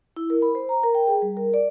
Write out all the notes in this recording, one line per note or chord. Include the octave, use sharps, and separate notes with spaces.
E4
A#4
B5
C5
A#5
A#4
G5
G#4
G3
A#4
D5